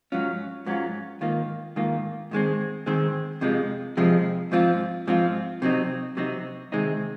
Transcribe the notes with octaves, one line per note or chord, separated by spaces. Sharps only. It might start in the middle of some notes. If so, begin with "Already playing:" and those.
G#2 F#3 C#4 F4
G#2 F#3 C#4 F4
G#2 D#3 A#3 F4
G#2 D#3 A#3 F4
G#2 D#3 G#3 C4
G#2 D#3 G#3 C4
F2 C3 F3 G#3
F2 C3 F3 G#3
G#2 F3 C4 F4
G#2 F3 C4 F4
C3 F#3 C4 D#4
C3 F#3 C4 D#4
C3 D#3 G#3 C4 D#4